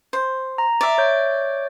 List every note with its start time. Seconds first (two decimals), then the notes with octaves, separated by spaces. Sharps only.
0.13 C5
0.58 A#5
0.81 D5 E5
0.98 C#5 G6